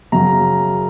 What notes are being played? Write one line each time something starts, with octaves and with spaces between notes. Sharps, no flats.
F#2 C#3 F#3 A#5